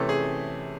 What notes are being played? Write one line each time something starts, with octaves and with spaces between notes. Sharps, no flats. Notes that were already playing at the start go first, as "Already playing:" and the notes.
Already playing: C3 E3 A3 C#4 A4
G#4